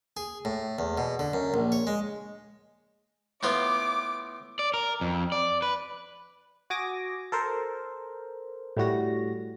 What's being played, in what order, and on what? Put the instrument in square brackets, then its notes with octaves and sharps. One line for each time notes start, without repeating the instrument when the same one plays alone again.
[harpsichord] G#4
A2
E2
B2
D3
F#2
A#1
C#5
G#3
[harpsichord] A2 B3 F4 [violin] D6
[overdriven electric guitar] D5
A#4
F2
D5
B4
[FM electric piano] F#4 G#5 D6 D#6 A#6
A4 A#4 C5
A2 G3 F#4 A#6